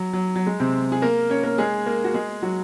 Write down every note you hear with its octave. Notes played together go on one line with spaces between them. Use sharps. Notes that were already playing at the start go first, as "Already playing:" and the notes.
Already playing: F#3
F#3
F#3
G#3
C3 C4
G#4
A#3 A#4
C#4 C#5
A#3 A#4
G#3 G#4
A#3 A#4
F#4
G#3 G#4
F#3 F#4